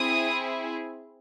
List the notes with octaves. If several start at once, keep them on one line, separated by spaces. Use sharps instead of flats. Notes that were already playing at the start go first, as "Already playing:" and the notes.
Already playing: C4 E4 G#4 D#6